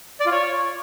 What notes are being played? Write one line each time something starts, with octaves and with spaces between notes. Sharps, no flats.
D5
F4
C#5